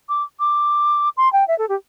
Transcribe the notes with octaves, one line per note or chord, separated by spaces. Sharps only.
D6
D6
C6
G5
E5
A4
G4